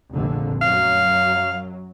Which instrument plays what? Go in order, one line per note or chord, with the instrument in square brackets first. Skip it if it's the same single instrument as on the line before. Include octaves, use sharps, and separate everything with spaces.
[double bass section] F1 A#1 D3
[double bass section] F#2 F#3 [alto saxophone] F5